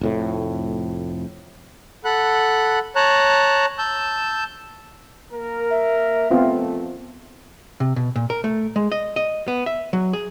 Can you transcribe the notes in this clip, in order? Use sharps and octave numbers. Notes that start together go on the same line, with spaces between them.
F1 F2 A2
A4 F#5 B5 F#6
C#5 A5 A#5 F#6
A5 E6 G6
A#3 A#4
E5
F2 A3 B3 C4 F4
C3
B2
A#2
A#4
A3
G#3
D#5
D#5
B3
E5
F#3
G#4